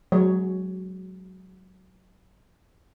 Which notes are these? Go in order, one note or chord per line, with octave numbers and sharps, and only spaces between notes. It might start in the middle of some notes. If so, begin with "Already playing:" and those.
F#3 G#3 C#5